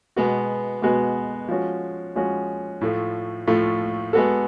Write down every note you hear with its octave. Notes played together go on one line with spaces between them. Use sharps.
B2 G#3 B3 F#4
B2 G#3 B3 F#4
F3 G#3 C#4 F#4
F3 G#3 C#4 F#4
A2 F3 A3 F4
A2 F3 A3 F4
G#3 B3 F#4 A4